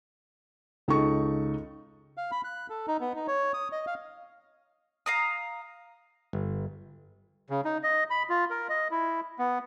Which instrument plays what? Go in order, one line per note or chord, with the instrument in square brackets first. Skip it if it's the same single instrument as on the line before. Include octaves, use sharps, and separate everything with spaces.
[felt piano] C#2 D#4 A4 C#6
[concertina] F5
B5
F#6
A4
D#4
B3
D#4
C#5
D#6
D#5
F5
[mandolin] F5 A#5 D#6
[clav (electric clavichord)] G1
[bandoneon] C#3
D#4
D#5
B5
F4
A#4
D#5
E4
B3